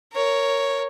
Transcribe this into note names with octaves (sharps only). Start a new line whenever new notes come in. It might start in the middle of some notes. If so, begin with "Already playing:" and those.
A#4 C#5